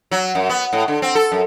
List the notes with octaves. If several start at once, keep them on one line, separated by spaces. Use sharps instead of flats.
F#3
F#2
B3
A2
D3
C4
A4
F#2